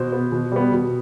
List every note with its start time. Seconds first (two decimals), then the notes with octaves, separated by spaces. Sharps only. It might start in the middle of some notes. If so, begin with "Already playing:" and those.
Already playing: B2 C5
0.12 B3
0.32 B2
0.52 G3 B3
0.72 B2